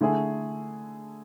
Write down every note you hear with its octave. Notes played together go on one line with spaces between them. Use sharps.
D3 A3 E4 G#4